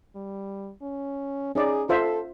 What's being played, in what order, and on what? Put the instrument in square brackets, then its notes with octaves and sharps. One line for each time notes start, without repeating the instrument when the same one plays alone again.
[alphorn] G3
C#4
[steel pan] C#4 D#4 D5 [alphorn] G#4
[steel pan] F4 C5 E5 [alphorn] A4